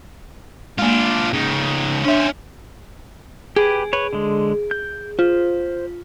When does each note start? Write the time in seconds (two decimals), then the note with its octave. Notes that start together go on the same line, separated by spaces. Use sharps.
0.78 G#3 A#3 D4 F4
1.33 C#3 D#4
2.04 C#4 D4 C5 C#5 E5
3.56 G4 G#4 B4
3.93 B4 C#5
4.13 D3 G#3
4.71 G6
5.19 F4 C5